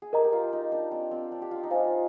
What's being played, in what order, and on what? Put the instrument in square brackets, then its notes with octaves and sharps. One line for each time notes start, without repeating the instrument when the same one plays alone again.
[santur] G#4
[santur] G4 [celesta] A#4 D#5 A#5
[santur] G4
F4
D#4
D4
C4
C4
D4
G4
F4
D#4
[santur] F4 [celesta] C5 F5 G#5